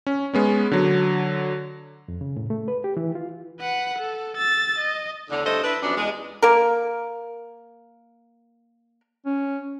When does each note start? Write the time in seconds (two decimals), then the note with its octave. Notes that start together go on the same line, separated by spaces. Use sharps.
0.07 C#4
0.34 G#3 B3 C#4
0.71 D3 F#3
2.08 F2
2.21 C#3
2.37 A2
2.50 A3
2.68 B4
2.84 G4
2.97 E3
3.15 F4
3.60 B4 F#5
3.98 A4
4.37 E6 A6
4.79 D#5
5.30 E2 A2 D3
5.45 G2 A3 A4 C5 D#5
5.64 D4 E4 B4
5.82 F#2 F3 B3 D4
5.97 E2 G3 G#3
6.42 A#3 A#4
9.26 C#4